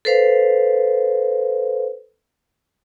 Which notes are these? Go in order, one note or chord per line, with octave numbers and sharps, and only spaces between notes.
A4 B4 C5 F5